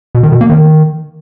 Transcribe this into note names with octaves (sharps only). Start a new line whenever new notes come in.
B2
D#3
B2
A#3
D#3